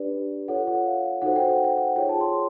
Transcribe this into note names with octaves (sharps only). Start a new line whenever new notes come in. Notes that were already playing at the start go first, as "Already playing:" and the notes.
Already playing: D4 G4 B4 D5
F4 A4 C#5 F#5
F#5
F5
D#4 F#4 A4 C5 F#5
G5
F#5
G5
F#5
F4 G#4 C#5 G5
A5
C6